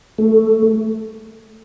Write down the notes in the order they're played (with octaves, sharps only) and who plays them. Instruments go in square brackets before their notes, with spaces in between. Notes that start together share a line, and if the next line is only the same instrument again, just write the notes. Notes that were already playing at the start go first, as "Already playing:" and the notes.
[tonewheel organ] A3